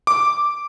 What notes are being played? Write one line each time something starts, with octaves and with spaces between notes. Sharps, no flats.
D6